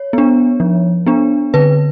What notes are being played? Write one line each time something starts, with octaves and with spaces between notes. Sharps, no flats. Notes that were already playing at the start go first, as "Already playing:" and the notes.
Already playing: C#5
B3 D4
F3
B3 D4
D3 B4